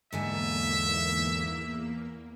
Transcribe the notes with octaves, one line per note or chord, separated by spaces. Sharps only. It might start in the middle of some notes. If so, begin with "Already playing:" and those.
E2 G#2 D3 A#3 E5 G#5